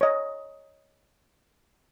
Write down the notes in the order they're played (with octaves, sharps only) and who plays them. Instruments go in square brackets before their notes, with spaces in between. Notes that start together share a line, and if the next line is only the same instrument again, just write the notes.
[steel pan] C#5 D#5